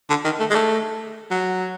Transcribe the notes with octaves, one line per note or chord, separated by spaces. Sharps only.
D3
D#3
A3
G#3
A3
F#3